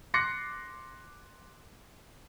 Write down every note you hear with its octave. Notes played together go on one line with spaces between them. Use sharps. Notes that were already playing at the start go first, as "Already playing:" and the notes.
C6 D6 F#6 A#6 C7 C#7